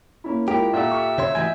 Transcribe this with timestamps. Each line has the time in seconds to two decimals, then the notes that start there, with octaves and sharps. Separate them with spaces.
0.24 A#3 C#4 E4
0.48 G#3 E4 F4 G4 A#4
0.73 A#2 A4 E5 F#5
0.91 C#6 F6
1.18 C#3 C#5 C6
1.35 A2 E3 F#4 D#5 G#5 G6 G#6